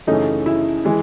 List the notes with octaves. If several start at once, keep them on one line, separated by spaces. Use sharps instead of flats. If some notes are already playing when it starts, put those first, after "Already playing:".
F#2 C#3 E3 A3 C#4 D#4
E4
E3 G#3